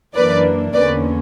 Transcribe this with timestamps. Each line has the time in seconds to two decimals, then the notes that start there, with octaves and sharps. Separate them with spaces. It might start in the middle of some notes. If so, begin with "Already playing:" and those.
0.15 F#2 E3 A#3 D4 B4 D5
0.74 E2 D3 A#3 C#4 B4 D5